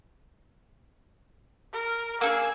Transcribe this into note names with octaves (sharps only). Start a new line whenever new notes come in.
A#4
A#3 D#4 G#4 E6